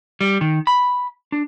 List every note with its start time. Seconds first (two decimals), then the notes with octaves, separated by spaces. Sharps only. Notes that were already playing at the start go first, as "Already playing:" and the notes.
0.21 G3
0.41 D#3
0.67 B5
1.32 D4